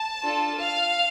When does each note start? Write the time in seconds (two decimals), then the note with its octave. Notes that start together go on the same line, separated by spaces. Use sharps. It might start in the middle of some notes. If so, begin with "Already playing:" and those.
Already playing: A5
0.25 D4 F4 A4
0.58 F5